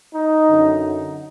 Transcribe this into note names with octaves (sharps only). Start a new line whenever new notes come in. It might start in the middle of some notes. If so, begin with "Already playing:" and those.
D#4
F#2 D3